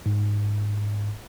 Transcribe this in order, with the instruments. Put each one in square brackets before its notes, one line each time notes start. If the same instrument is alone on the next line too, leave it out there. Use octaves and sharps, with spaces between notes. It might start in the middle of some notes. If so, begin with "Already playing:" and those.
[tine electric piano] G#2